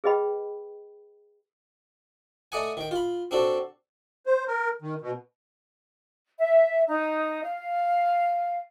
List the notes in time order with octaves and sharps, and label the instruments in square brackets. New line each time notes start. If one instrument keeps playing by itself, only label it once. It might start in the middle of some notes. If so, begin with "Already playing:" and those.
[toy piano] G#4 B4 D#5 G5 B5
[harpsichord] A3 D5 D#5 F#5 G#5
D#3 G5
F4 B5
C4 D4 F#4 A4
[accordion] C5
A#4
D#3
B2
[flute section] E5
D#4
F5